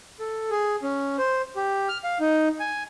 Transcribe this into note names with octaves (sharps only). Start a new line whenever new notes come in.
A4
G#4
C#4
C5
G4
F6
F5
D#4
G#5